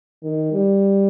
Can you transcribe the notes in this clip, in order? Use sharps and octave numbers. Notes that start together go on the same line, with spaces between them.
D#3
G3